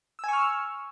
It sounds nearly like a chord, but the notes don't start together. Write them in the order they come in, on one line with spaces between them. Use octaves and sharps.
E6 G#5 C#6 F6